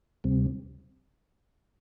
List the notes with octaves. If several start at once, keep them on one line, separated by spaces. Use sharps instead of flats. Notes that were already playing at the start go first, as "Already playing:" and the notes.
D2 C3 G3 C4